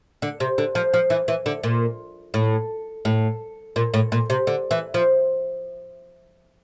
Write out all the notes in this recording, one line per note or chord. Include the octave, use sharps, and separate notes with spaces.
D3
C3
D3
F3
F3
E3
E3
D3
A#2
A2
A2
A#2
A2
A#2
C3
D3
E3
F3